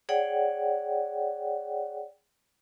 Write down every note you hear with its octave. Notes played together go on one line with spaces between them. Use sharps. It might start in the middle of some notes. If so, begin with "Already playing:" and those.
G#4 C#5 D5 F#5 G5